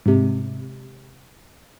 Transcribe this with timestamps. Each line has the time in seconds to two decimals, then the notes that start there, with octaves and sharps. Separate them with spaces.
0.06 G#2 C3